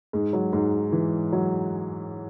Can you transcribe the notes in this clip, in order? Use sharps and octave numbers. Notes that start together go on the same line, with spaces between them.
G#2 G#3
F#3
G#2 G#3
E3
F#3